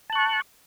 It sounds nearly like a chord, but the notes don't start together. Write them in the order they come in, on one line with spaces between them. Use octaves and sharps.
A5 F#6 C#6